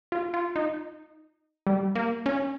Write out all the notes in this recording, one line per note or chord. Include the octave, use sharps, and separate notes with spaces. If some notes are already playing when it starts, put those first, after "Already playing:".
F4
F4
D#4
G3
A#3
C#4